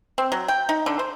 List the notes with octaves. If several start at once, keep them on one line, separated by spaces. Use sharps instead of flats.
C4
F#3
G5
D#4
D3
C5